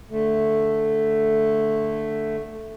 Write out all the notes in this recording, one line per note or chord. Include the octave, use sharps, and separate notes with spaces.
D3 A3